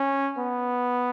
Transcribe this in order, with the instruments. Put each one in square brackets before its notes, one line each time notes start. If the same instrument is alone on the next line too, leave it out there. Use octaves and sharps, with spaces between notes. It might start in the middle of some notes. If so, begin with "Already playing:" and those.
Already playing: [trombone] C#4
B3